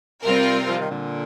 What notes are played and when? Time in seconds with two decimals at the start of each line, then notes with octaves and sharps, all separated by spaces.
0.23 C3 G3 C4 F4 A#4
0.69 F3
0.79 D#3
0.90 A#2 D3